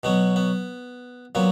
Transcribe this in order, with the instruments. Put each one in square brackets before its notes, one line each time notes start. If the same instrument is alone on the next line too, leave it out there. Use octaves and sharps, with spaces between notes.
[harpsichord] B2 F#3 B3
B3
A#2 F#3 B3